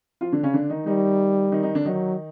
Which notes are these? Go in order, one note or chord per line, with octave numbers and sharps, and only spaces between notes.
F3 F4
D3 D4
C#3 C#4
D3 D4
D#3 D#4
D#3 G3 D#4
D#3 D#4
D#3 D#4
D3 D4
D#3 F#3 D#4